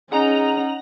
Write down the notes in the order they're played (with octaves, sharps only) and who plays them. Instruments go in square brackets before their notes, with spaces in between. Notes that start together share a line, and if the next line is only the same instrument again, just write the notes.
[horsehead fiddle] C#4 [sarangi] D#4 [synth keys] G#4 [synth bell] F#5 A#5 F7